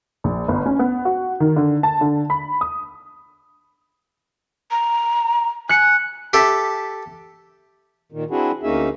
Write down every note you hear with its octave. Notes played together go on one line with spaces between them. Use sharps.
A#1
G1
C#4
B3
F#4
D#3
D3
A5
D3
B5
D#6
A#5
G#5 F#6 C#7
G4 A4 E5
A#2 D#3
C4 D4 E4 F#4 G#4
D2 A#3 C#4 D#4 G#4 E5